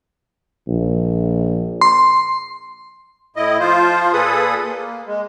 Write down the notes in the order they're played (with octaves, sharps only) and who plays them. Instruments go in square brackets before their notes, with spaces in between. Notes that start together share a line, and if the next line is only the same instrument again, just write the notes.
[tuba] A#1
[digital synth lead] C6
[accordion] A2 E4 D#5
F3 F4 C5
A#2 G#4 A4 B4 D#6
A#3
G#3